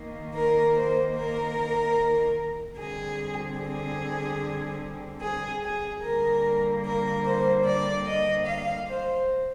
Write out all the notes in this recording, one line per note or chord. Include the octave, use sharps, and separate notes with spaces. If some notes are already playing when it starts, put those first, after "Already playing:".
Already playing: D#3 A#3
A#4
C5
A#4
D3 G3 C4 G#4
G#4
G#4
G#4
D3 G3 A#3 A#4
A#4
C5
D5
D#5
F5
C5